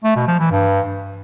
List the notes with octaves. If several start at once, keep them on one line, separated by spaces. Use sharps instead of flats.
A3
B2
F3
E3
G2